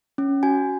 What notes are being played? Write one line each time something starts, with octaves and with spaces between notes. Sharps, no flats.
C#4
F#4 G#5